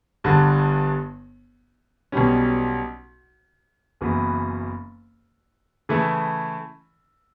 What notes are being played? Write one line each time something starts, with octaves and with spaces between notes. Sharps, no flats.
G1 G2 D3
B1 B2 G3 C#4
F#1 F#2 E3 B3
C#3 E3 A3 E4